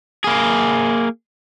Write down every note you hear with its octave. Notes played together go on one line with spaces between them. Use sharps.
A#3 G#4